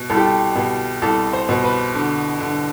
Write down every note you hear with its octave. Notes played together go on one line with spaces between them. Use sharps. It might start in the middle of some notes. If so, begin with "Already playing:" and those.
Already playing: B2
C2 A4
G4
A4
B2
C2 A4
C5
B2
B4
D3
D3